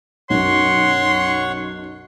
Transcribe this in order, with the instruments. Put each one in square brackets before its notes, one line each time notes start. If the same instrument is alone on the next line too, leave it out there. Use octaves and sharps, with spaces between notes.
[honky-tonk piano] B1 F#2 [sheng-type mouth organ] C#5 F#5 C#6 [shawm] C6